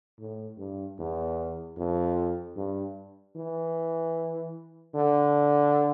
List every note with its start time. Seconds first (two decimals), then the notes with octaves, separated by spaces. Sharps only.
0.19 A2
0.58 G2
0.98 E2
1.77 F2
2.56 G2
3.36 E3
4.95 D3